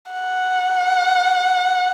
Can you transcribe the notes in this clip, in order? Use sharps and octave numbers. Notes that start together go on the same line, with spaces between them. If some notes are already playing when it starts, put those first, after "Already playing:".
F#5